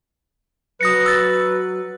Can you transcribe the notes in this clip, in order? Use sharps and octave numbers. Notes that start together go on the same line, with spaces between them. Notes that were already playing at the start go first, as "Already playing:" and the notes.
F#3 B4 D#6 A#6 C#7
E6 A6